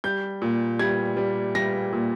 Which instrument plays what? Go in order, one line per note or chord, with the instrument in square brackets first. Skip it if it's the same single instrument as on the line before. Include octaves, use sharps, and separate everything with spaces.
[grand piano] G3 G6
A#2
G3 G#6
G3
G3 A#6
A#2